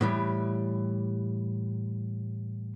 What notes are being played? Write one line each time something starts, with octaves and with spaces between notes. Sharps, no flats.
A2 E3 G3